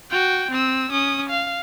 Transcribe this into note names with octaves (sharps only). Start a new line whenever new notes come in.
F#4 G5
C4 E6
C#4 D#6
F5